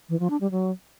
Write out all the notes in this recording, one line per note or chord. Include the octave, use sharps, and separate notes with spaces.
E3
F3
D4
G3
F#3